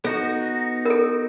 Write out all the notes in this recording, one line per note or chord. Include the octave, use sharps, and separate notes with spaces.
B3 D#4 F#4 A4
A#4
A4